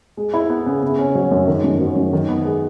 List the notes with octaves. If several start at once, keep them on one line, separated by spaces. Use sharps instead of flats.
G#3
E4
B3
C#3
C#3
C#4
F#3
F#2
D#3
F#2
F#3
F#2
D#3
B3
G#3